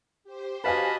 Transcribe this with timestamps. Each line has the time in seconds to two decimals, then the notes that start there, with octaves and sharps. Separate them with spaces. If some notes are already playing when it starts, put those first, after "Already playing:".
0.24 G4 C5
0.64 F#4 B4 D#5 F5 G#5 A5 B5